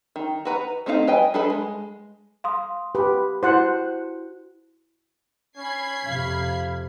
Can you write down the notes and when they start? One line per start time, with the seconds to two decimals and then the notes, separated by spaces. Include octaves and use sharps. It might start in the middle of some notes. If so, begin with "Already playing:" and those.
0.16 D#3
0.45 F#4 B4 A#5
0.86 A3 C4 D4 D#4 F5
1.07 B4 D#5 G5 G#5
1.34 D4 G#4 A4 B4 B5
1.50 G#3
2.44 F5 C6 D#6
2.95 G4 B4
3.43 E4 F#4 C5 F#5 F#6
5.56 C#4 B5 G#6 C7
6.06 F2 C3 F5